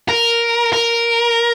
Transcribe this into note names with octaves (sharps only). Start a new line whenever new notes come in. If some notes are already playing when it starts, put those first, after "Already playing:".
A#4
A#4